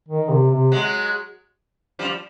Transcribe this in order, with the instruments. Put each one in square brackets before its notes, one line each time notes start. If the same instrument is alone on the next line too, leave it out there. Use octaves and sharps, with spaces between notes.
[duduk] D#3
C3
C3
[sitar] F#3 G#3
F3 G3